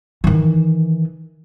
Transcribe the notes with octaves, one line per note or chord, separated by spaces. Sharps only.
D#3 E3